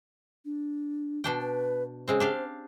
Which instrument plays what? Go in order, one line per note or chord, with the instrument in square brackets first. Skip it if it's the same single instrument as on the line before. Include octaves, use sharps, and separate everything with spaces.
[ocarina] D4
[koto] B2 D4 G5
[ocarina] B4
[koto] C#3 G#3 C4 [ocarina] C5
[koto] D4 G4 F5